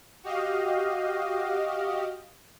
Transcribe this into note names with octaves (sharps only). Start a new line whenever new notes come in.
F#4 G4 D#5 F5